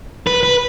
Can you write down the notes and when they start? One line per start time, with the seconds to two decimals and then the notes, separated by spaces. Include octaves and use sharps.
0.27 B4
0.43 B4